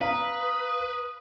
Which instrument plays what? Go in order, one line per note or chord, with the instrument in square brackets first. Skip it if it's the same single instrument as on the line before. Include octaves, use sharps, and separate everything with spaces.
[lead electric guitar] B4 [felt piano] F5 A#5 [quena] D#6